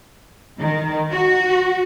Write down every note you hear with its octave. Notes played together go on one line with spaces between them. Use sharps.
D#3
F#4